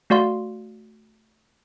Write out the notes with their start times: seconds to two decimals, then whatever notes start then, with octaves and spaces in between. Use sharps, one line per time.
0.10 A3 F#4 D5 F5 C6